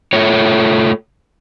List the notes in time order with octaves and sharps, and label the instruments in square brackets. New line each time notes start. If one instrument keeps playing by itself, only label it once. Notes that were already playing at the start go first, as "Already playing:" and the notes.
[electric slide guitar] A3 F4 C#5